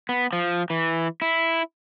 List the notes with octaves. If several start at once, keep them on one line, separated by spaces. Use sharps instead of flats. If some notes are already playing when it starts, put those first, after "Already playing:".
B3
F3
E3
E4